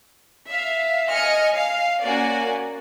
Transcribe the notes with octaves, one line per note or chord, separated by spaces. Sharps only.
E5 F5
D#5 G#5 F6 C#7
F5
A#3 C#4 F#4 D5 F#5 G#5